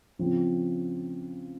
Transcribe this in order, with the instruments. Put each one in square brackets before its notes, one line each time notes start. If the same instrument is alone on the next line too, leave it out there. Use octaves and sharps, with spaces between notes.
[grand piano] C#3 F3 C4 F4